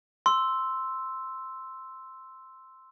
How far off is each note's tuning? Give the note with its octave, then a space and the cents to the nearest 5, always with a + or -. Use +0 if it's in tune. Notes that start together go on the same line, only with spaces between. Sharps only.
C6 +0 E6 +0